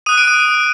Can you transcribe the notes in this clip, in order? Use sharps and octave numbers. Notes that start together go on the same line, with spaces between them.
D#6 F#6 D#7
D7
D#7